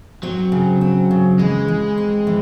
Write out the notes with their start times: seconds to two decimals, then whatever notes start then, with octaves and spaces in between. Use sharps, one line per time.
0.23 F#3 C4
0.52 C#3
0.81 C4
1.11 C#3
1.39 E3 G#3
1.68 E3
1.98 C4
2.27 E3